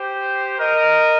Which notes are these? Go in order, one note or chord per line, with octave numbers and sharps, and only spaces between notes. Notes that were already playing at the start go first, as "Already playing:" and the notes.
Already playing: G4 C5
A#4 D#5